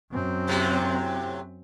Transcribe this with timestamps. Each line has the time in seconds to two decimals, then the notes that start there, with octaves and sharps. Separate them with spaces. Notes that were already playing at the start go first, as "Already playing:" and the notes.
0.12 F#2 C4
0.47 A2 C3 F#3